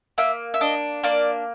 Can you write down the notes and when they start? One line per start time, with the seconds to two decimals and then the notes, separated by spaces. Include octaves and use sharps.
0.18 A#3 E5
0.54 E5
0.61 D4 D#5
1.03 A#3 D5